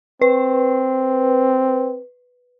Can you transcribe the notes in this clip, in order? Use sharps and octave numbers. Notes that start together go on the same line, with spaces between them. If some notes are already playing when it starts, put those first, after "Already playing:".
C4 B4